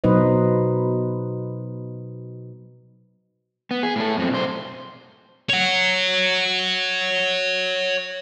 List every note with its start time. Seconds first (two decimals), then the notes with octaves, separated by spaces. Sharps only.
0.04 B2 F#3 D#4 B4 C5 D#5
3.71 B3
3.83 G#4
3.96 A2 A4
4.17 F#2 C4
4.31 B1 C5
5.49 C#5 F#5